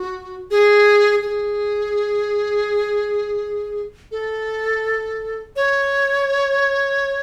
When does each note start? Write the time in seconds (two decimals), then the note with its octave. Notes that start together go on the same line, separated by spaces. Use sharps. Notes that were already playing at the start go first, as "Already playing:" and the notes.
Already playing: F#4
0.51 G#4
1.22 G#4
4.11 A4
5.56 C#5